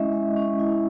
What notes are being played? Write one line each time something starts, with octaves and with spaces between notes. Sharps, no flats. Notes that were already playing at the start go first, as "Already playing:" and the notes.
Already playing: G#3 C#4 E4 D#5 E5
G#3
C#4
E4